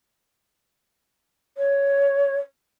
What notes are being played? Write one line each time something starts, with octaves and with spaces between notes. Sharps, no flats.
C#5